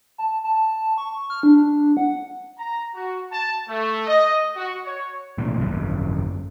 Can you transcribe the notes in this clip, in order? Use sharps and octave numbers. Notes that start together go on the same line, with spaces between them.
A5
A5
C#6
F6
D4
F#5
A#5
F#4
A5
A3
D#5
F#4
C#5
A1 D2 B2 A#3
G#1 F#2